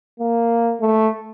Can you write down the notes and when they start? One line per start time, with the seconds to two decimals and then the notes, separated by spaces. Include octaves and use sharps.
0.20 A#3
0.81 A3